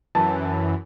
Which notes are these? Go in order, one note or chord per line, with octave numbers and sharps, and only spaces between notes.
F#2 E3 A5